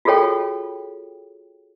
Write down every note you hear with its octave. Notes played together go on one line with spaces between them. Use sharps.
F4 F#4 G#4 A4 C#5 G5